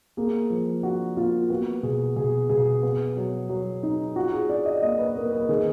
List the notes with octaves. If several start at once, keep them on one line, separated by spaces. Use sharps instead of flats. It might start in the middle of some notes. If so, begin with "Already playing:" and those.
A#3 G#4
F3
D4 F#4
A#3 F4
B3 F#4
B2 G#4
B2 G#4
B2 G#4
B3
F#3
F#3
D#4
F4 F#4
G#4
D4 D5
D#5
A#3 D#5
B4
A#3 A#4
B4
A#4
D#3 G#4